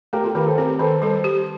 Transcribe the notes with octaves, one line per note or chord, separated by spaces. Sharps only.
A3 G4 A#4
F4 A4
D#3 G4 A#4
A4 C5
C4 G4 A#4
D#3 A4 C5
G3 A4 C5
G4